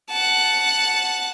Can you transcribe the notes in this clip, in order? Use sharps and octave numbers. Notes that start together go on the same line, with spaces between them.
F#5 A5